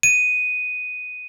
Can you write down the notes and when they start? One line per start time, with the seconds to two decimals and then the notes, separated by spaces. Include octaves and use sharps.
0.03 D#7